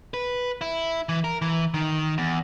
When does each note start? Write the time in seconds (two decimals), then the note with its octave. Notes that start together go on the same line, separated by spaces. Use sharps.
0.14 B4
0.61 E4
1.09 E3
1.24 A#4
1.42 E3
1.74 D#3
2.18 E2